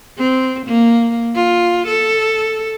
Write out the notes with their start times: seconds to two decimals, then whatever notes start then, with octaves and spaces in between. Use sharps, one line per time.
0.18 C4
0.66 A#3
1.34 F4
1.87 A4